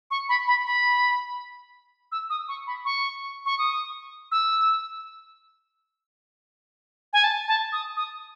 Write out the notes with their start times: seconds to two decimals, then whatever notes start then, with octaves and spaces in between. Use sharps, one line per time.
0.11 C#6
0.29 B5
0.48 B5
0.66 B5
2.12 E6
2.30 D#6
2.48 C#6
2.67 B5
2.85 C#6
3.46 C#6
3.58 D#6
4.31 E6
7.13 G#5
7.24 A5
7.48 A5
7.72 D#6
7.97 D#6